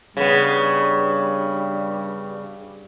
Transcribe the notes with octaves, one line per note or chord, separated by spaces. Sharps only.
G2 C#3 G3 B3